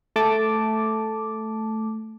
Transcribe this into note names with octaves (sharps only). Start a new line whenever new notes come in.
A3 A5 D6